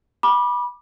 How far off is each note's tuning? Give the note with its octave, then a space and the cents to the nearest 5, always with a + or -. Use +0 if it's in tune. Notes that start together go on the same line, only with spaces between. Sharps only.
B5 -20 D6 +15